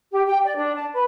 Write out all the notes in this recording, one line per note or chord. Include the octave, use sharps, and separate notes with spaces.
G4
G5
D5
D4
A5
B4